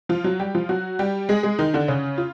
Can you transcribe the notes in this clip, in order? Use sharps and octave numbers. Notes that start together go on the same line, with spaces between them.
F3 F4
F#3 F#4
G3 G4
F3 F4
F#3 F#4
G3 G4
G#3 G#4
G#3 G#4
D#3 D#4
D3 D4
C#3 C#4
F4